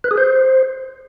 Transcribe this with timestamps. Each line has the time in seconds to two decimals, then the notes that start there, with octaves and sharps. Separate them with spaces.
0.04 B4
0.11 G#4
0.18 C5